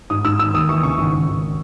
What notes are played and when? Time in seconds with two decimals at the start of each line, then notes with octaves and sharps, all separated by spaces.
0.10 G#2 D#6
0.25 G#2 E6
0.39 D#3 E6
0.54 D#2 D#6
0.68 E3 C#6
0.83 C#3 C#6
0.98 G#1
1.13 G#1
1.28 G#1